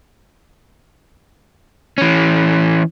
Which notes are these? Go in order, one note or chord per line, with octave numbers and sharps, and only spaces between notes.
E3 C#4